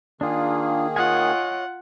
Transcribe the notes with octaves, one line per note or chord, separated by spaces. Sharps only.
D#3 A#3 D4 F4 G#4
F4 C#5 D#5 F#5 G#5